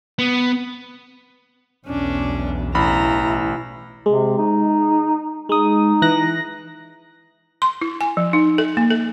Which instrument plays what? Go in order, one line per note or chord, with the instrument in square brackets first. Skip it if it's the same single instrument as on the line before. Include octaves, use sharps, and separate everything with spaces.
[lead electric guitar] B3
[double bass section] B1 E2 [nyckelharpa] C#4 D4
[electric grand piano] A1 B5 [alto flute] E4 [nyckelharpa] A#5
[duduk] C3 [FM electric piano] G#3
[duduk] D#4
[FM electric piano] G#3 D#6 [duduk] D#4
[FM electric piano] E3 F#6 A#6
[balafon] C6
E4
G#5
F3
D#4
A4
A#3
A4